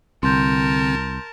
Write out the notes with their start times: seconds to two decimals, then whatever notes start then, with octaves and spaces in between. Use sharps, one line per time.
0.23 C2 D3 C4 A#4 A5 C6 G6